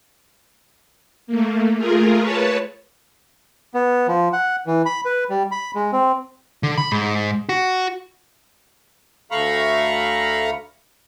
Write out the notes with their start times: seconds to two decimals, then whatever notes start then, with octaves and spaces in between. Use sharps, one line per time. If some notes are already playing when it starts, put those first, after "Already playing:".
1.27 A3 A#3
1.76 A3 F4 G#4 A#4
2.20 B4 C#5 A5
3.74 B3
4.08 F3
4.33 F#5
4.67 E3
4.86 B5
5.05 B4
5.30 G3
5.51 B5
5.75 G#3
5.92 C4
6.63 D3
6.78 B5
6.92 G#2
7.49 F#4
9.31 D2 A3 F5 A#5 B5 C#6